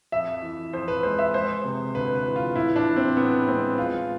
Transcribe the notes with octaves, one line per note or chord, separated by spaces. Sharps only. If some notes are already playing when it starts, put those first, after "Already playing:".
F2 E5
E3
F2 C5
B4
G#3 C5
E5
G#3 C5
C3
D2 B4
B4
E3
F4
A2 E4
D4
E3
C4
A2 B3
G#3 C4
G#3 F4